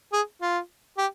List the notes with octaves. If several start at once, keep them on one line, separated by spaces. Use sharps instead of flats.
G#4
F4
G4